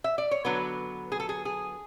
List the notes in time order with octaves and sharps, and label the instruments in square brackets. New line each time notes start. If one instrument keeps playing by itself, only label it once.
[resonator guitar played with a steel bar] E5
D5
C#5
D3 F#3 B3 B4
G#4
A4
G#4
G#4